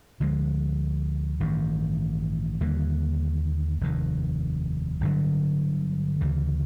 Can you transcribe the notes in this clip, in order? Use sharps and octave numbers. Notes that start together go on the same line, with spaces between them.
D2 D3 F3 G#3
A1 G2 D#3
D#2 D3 G3 A#3
F1 D#2 D#3
G1 G2 D3 F#3
D2 C#3 E3